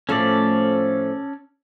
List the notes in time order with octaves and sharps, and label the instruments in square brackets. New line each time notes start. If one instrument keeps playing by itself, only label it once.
[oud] A2 F3 A3 [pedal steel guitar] C#4 A4 D5